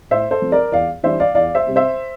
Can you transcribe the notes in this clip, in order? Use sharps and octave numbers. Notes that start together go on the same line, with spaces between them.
A2 C5 E5
A4 C5
F3 C4
A#4 D5
E2 D5 F5
E3 G3 D4 C5 E5
D5 F5
E2 D5 F5
C5 E5
C3 G3 C4
C5 E5